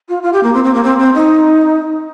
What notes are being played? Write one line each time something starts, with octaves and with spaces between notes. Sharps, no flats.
F4
F4
G4
A#3
C4
C4
A#3
C4
C4
D#4